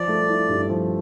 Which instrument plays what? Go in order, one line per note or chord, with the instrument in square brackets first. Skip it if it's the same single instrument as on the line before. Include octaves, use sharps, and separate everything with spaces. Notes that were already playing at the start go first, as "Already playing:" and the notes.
Already playing: [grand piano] F3 [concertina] D5
[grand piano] A3
E4
G2
F3